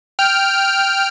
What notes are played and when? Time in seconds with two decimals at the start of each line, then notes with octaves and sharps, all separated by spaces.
0.19 G5 F6